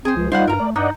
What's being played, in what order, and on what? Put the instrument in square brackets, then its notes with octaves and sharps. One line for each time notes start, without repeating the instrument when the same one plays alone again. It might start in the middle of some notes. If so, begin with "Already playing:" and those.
[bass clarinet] C4 [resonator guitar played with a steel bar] G#4 C5
[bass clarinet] C#2 [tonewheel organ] F3
[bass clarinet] G3 [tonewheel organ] D#4 F4 [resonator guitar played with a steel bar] C5 F5 F#5
[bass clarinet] G2 [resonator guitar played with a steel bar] A#4 A#5
[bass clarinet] A3 [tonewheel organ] D5
[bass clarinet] G2 [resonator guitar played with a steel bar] D#4 [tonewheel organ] D5 D#5 F#5